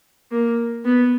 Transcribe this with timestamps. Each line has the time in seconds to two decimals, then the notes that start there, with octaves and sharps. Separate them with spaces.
0.31 A#3
0.85 B3